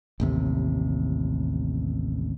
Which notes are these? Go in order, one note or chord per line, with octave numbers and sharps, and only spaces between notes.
A1 D#2 C3